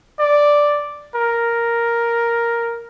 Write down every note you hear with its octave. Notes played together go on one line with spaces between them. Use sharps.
D5
A#4